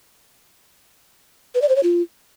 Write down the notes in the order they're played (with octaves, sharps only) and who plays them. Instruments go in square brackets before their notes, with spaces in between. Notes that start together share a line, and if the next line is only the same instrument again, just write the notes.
[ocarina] B4
D5
C5
C#5
F4